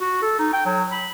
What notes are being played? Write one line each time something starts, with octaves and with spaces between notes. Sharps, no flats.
F#4
A4
D#4
G5
F#3
B5